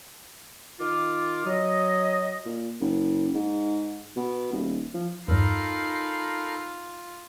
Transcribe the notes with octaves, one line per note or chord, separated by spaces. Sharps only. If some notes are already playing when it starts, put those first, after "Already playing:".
D#3 F4 D6
F#3 D#5
A#2
F#1
G#2
B2
D#1
F3
E2 G2 D#4 F4 A4 A#4 B5 C7